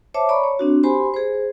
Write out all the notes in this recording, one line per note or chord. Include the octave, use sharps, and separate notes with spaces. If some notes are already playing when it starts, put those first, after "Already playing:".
C5 C#5 E5 A5 D6
C#5 D5 A#5 B5 C#6
C#5
C4 D4 F#4
G4 C5 G#5 B5 C6
G#4 C5